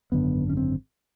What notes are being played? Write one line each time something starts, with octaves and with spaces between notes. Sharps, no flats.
G#1 F#2 D3 B3
C#4
C4